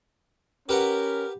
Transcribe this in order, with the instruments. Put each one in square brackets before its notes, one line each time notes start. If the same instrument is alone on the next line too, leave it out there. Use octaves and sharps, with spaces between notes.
[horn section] C#4 A#4 [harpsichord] G4 B4 F#5